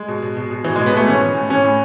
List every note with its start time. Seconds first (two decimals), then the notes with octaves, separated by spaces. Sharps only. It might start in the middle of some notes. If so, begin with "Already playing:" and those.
Already playing: G#3
0.08 B2
0.22 B2
0.37 B2
0.51 B2
0.64 B2 E3
0.76 B2 G#3
0.86 B3
0.93 B2 A3
1.08 E3 C#4
1.21 E3
1.37 A2
1.50 E3 C#4
1.64 A2